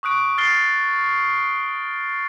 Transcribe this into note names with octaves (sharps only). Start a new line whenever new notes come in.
C#6 D#6 F#6 D7
F6 A6 C7 G7